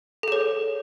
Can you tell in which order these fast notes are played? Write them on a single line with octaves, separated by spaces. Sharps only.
A4 G#4 C#5